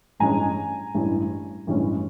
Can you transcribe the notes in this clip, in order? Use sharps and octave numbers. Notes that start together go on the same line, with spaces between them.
A1 G2 E3 G#3 C#4 G#5 A#5
A1 G2 E3 G#3 C#4
A1 G2 E3 G#3 C#4